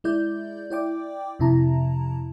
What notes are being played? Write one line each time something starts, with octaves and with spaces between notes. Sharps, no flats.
G#3 E4 D5 G6
E4 D5 G5 D6
F2 C3 E4 A5 A#5